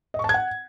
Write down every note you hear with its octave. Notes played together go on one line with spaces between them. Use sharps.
D#5
C#6
A5
G#6
F#5